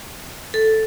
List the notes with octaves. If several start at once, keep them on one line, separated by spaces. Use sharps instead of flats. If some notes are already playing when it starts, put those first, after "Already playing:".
A4